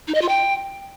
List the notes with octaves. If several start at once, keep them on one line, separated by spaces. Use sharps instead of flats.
D#4
D#5
F4
G5